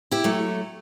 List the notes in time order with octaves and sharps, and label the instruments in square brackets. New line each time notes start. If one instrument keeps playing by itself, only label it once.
[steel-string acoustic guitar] E4 G4
F#3 A3